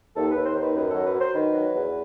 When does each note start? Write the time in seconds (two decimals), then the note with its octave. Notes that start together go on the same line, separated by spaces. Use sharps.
0.16 D#2 A4
0.31 B4
0.36 D#2
0.45 C5
0.55 D#3
0.61 B4
0.75 F#2 B4
0.90 F#3 A4
1.05 B4
1.14 F#3
1.20 C5
1.34 D#3 B4
1.54 F#3
1.74 E2